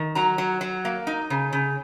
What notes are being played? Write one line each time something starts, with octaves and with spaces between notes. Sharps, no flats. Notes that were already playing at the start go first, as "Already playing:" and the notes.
Already playing: D#3
F#3 A#5
F#3
F#3
A#3
D#4
C#3
C#3